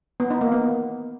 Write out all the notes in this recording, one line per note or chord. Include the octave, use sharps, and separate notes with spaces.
B3
D#4
A#3
B3